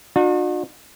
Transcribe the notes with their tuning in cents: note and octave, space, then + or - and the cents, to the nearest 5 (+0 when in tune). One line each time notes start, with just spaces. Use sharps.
D4 +45 F#4 -40